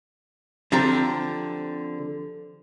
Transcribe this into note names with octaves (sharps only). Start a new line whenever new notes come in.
D3 F3 C4 G4 A#5